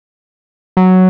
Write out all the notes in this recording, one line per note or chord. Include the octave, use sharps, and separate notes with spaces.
F#3